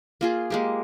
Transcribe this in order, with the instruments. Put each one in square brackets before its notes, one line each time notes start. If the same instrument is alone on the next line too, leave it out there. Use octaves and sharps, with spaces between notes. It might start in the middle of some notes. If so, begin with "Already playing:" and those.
[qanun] A#3 F4 G#4
G#3 A#3 G4